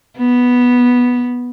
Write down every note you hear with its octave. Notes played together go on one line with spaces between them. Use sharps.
B3